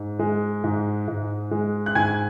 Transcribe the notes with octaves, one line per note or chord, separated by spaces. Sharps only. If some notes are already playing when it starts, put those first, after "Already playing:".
Already playing: G#2
G#3
G#2
G#2
G#3
F#6
G#2 G#5 G#6